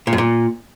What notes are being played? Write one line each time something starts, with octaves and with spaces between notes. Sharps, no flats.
A#2
F#2
A#2